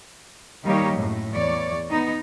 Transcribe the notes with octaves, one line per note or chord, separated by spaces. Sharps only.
D#3 G3 A#3 D#4 G4 C#5
F#2 A2
E2 C#5 D5
B3 D#4